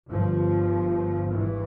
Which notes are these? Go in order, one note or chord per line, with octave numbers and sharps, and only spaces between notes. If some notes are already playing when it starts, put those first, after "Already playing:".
G1 G2 F3
G#1 G2 E3